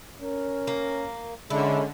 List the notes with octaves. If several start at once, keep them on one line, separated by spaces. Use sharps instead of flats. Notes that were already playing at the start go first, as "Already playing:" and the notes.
C#4 A#4
A#3
D3 G#3 C#4 E4